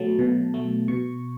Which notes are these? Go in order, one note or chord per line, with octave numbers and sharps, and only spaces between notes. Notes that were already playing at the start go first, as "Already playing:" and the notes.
Already playing: B2 F#3 A3 A5
B2
F#3 A3
B2 C#6